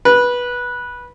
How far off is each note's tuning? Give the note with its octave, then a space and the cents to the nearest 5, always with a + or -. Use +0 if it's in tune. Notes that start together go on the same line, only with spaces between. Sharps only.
B4 -15